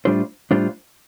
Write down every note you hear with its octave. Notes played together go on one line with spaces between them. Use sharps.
A2 G3 D4 F4 C5
A2 G3 D4 F4 C5